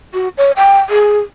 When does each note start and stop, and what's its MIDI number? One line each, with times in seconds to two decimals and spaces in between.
0.14 0.28 66
0.38 0.52 73
0.57 0.78 79
0.90 1.19 68